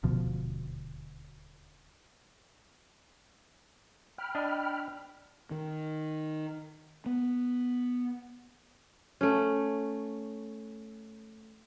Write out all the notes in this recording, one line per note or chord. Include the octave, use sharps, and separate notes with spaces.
D#1 D2 B2 F3
G5 B5 F6
D4 D#5
D#3
B3
A3 C#4